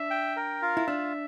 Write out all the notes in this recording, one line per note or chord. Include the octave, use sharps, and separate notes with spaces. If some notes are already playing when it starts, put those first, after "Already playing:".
Already playing: D4 E5
G5
A#4
F4
E4
D4 E5